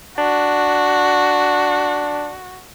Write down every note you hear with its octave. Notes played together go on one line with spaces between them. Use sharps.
D4 F#4